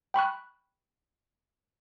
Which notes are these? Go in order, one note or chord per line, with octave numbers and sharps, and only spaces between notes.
G5 B5 C#6 F#6